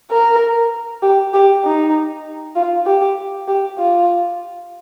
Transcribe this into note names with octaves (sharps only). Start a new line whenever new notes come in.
A#4
G4
G4
D#4
F4
G4
G4
F4